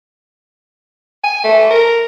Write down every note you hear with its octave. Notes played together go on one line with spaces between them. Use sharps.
G#5
A3
A#4